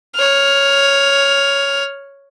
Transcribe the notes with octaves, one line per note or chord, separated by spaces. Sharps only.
C#5 F6